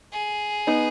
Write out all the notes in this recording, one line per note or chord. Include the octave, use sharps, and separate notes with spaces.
G#4
B3 D#4